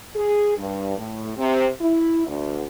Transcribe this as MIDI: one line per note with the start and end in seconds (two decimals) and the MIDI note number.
0.16 0.54 68
0.57 0.95 43
0.97 1.32 45
1.37 1.67 48
1.81 2.26 64
2.27 2.66 38